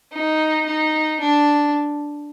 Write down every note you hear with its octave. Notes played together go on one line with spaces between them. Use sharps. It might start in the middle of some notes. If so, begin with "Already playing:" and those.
D#4
D#4
D4